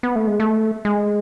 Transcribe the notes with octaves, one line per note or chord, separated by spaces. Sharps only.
B3
A3
G#3
A3
G#3